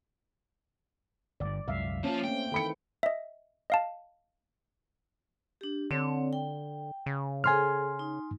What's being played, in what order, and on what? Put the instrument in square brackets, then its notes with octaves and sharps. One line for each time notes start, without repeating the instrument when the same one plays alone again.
[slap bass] G1 G2 [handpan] D5
[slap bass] C2 F#2 G#3 [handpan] E5 F5
[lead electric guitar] F3 F4 [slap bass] A#3 [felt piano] C#4
[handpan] A3 C4 [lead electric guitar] G5
[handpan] D#3 E3 [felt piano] A4 B5 C#7
[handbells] D#5 E5
D#5 F5 A5
[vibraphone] D4 G4
[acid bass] D3 [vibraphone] C4 C#5
[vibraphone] G5
[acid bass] C#3
[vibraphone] G#4 A4 C5 [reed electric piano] G#5 C6 F6
[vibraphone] D#4